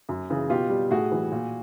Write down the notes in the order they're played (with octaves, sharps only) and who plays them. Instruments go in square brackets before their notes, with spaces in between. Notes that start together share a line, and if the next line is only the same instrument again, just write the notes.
[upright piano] F#2
C#3 E3
B2 F4 G4
G3
A2 F#4 G#4
E3 G3
A#2